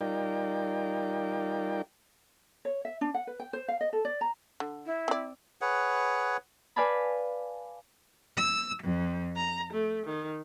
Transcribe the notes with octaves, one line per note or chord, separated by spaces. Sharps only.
G3 D#4 F4 A#4 D5 G5
C#5
E5
D4
F#5
B4
G5
C5
F5
D#5
A4
D5
A#5
D3
E4
C4 D5
G#4 B4 C#5 F#5
B4 D5 F5 G#5 A5 B5
E6
F2
A#5
A3
D#3